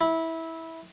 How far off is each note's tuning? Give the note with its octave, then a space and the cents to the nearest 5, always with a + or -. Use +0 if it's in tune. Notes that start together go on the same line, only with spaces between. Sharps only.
E4 -15